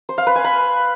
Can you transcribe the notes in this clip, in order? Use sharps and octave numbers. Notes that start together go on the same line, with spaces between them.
C5
F5
B4
G#5
B5